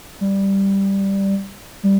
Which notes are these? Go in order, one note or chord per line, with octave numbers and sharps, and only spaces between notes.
G3
G3